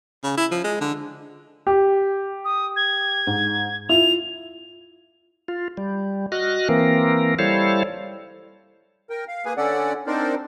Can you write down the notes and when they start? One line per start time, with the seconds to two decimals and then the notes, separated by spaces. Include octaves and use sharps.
0.24 C#3
0.37 E4
0.51 F3
0.64 G#3
0.81 D3
1.67 G4
2.45 D#6
2.76 G#6
3.27 G#2
3.89 E4 F4 F7
5.48 F4
5.77 G3
6.32 F#4 D#5 F6 F#6
6.69 E3 A#3 C4 A#4
7.39 G3 E4 A4 C5 C#5 F5
9.10 A#4 G5
9.28 F5
9.45 A#3 G#4 B4 G#5
9.57 D3 C#4 A4 D5 F#5
10.07 C4 D4 D#4 A#4 C5 D5